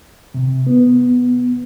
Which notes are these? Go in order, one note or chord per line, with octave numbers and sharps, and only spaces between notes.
C3
B3